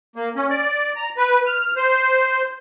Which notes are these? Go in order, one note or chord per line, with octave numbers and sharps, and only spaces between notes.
A#3
C#4
D5
A#5
B4
F6
C5